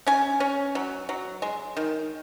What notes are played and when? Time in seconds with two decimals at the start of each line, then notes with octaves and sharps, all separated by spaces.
0.07 C#4 G#5
0.40 C#4
0.75 F#3
1.09 F#3
1.42 G#3
1.77 D#3